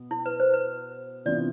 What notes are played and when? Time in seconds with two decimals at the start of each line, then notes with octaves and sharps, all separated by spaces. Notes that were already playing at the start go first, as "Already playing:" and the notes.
Already playing: B2 B3
0.11 E4
0.26 B4
0.40 C5
0.54 B4
1.25 C3 E3 B3 D4 F4 D5